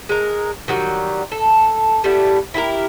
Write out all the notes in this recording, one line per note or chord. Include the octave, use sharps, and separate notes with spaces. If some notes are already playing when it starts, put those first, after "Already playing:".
G#3 A#4
D#3 F#3 G3
A4
G3 A3 B3 E4
E4 G4 A4 A#4